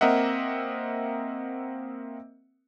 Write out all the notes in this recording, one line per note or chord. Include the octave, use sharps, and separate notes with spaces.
A#3 C4 A#4 D#5 E5 F#5